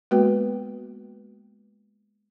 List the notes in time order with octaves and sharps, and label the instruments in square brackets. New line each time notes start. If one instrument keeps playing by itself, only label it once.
[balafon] G#3 A#3 B3 F#4 B4 G5